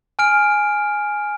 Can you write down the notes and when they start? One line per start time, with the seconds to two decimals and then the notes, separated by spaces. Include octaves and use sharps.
0.19 G#5 F6 D7